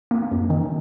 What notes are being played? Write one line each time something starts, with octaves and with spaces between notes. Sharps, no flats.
A#3
F#2
D#3